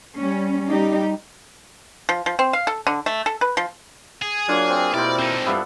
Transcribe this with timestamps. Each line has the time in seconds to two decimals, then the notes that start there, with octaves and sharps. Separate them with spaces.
0.16 G3 C#4
0.68 G3 D#4 G4
2.09 F3
2.26 F3
2.39 C4
2.53 F5
2.67 A4
2.87 D3
3.06 A3
3.26 A4
3.41 B4
3.57 F3
4.22 G#4
4.48 F#3 A#3 D4 F4 C#5
4.69 C4
4.94 B2 G3 A#3 E4 C5 D5
5.19 C4 D#4 A4
5.46 G2 B3 D4 E4 F4 A4